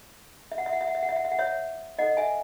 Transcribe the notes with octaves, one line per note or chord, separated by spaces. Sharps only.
E5
F#5
E5
F#5
E5
F#5
E5
F#5
E5
F#5
E5
F#5
C#5 E5
D#4 A4 C5 D#5 F#5
E5 G#5